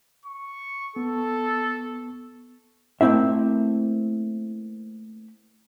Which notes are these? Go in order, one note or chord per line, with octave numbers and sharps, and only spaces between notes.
C#6
B3 A4 C#6
A3 A#3 C4 E4 E5